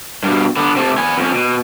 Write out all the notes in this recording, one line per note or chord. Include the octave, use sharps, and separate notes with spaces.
G2 B2
D3 B3
C3 A3
B3 G#5
F2 C#4
B2